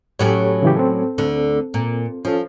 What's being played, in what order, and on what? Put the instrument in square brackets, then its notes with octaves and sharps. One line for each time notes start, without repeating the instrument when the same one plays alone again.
[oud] A2 F#3 C#4 [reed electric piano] G4 A4 C#5
[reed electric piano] C#3 E3 G4
C4 A4
[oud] D2 D3
A#2
[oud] F3 [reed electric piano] C#4 F4 A4